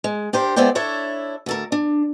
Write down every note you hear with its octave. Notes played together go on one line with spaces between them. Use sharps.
G#3
D4 G4 A#4 C5
G#3 B3 E4 C5 D5 G5
D4 E4 A4 C#5 E5
D2 A4 A#4
D4